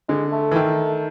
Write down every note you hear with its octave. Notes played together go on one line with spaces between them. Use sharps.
D3 G#3
A3
E3
D#3